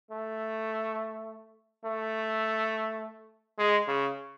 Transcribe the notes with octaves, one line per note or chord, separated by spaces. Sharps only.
A3
A3
G#3
C#3